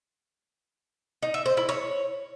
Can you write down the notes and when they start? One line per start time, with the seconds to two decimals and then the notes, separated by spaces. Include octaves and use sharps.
1.22 D#4
1.34 E5
1.46 C5
1.57 E4
1.69 C#5